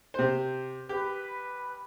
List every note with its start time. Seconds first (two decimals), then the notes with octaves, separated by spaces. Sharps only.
0.14 C3 C5
0.89 G4 B4